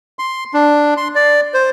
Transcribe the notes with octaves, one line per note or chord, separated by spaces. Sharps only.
C6
D4
C6
D5
C5